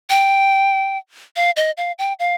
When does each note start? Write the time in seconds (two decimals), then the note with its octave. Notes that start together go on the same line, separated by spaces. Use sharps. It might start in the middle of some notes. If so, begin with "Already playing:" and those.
0.10 G5
1.36 F5
1.56 D#5
1.77 F5
1.99 G5
2.19 F5